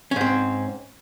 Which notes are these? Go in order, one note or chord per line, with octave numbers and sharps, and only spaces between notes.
G#2 C4 C#4